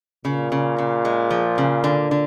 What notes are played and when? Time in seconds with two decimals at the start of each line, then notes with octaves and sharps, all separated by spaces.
0.25 A#2 C#3
0.52 C#3
0.78 C#3
1.05 G#3
1.30 F3
1.58 C#3
1.84 D3
2.11 D3